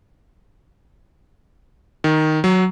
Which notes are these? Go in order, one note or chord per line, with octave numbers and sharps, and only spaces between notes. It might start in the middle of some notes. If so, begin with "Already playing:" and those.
D#3
F#3